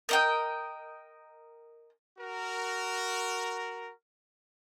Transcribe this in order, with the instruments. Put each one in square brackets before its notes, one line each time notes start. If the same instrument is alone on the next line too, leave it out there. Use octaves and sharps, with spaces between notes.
[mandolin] A#4 D#5 G5
[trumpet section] F#4 A#4